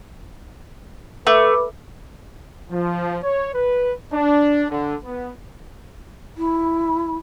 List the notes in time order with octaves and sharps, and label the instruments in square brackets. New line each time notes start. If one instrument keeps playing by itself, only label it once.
[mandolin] A3 [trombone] B4 [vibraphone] D6
[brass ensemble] F3
C#5
B4
D4
D3
B3
[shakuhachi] E4